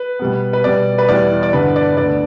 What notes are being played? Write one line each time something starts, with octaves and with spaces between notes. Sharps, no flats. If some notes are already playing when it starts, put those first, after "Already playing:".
Already playing: B4
B2 G3 B3
B4
B2 G3 B3 D5
B4
E2 E3 G3 B3 D5
D5
G2 D3 B3 B4
D5
D2 D3 B3 D5